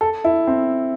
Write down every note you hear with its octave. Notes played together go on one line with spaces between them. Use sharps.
A4
E4
C4